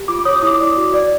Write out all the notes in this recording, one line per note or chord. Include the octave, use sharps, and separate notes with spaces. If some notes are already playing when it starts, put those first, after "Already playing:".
Already playing: G4
F4 D6
C#5 D#6
D#6
E4 D6
D5
F#4
D5